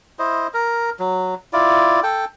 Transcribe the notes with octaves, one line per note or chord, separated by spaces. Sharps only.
E4 C5 D#5
A#4
F#3
E4 F4 D5
A4 G5